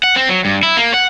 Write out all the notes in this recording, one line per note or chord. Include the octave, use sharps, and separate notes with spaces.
F#5
C4
F#3
G2
E4
A#3
F#5